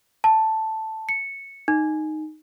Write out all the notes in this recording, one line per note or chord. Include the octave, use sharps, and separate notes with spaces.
A5
C#7
D#4